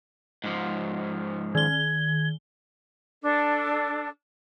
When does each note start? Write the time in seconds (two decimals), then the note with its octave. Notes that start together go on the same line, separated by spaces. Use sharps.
0.44 G#2 F3
1.55 D#3 G#6 G7
3.22 D4 A4